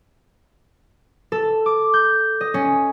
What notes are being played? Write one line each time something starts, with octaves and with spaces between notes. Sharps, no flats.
A4
D6
G6
D#5
C#4